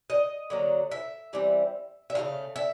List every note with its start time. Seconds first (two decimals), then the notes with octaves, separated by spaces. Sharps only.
0.10 D#5
0.50 D3 F#3 A#3
0.91 E5
1.33 E3 G3 C4
2.10 E5
2.15 C#3 F3 A3 F5
2.56 E5